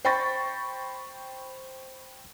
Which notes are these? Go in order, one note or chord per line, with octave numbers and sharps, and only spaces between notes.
C5 G5 B5 C#6 A6 A#6